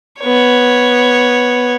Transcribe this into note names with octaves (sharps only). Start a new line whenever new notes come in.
B3 C#5